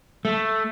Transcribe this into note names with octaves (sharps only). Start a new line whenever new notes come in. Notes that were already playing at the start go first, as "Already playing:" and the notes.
A3